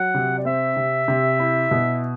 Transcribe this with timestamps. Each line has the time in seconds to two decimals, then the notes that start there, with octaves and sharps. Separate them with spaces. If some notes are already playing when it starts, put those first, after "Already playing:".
Already playing: F#3 F#5
0.14 C3
0.38 D5
0.45 C4 E5
0.76 C3
1.08 C3
1.39 E4
1.71 B2